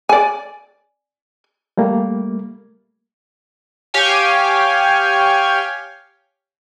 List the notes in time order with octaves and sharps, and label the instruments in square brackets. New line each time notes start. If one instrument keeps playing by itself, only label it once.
[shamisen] D5 G#5
[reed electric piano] G3 A3 A#3
[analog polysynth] G4 C#5 F5 G5 G#5